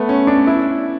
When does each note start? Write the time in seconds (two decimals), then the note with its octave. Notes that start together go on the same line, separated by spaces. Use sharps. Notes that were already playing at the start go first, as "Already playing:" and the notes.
Already playing: A3 B3
0.09 C#4
0.27 D4
0.47 E4